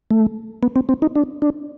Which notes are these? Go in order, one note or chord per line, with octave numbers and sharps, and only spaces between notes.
A3
B3
C4
C4
D#4
D4
D4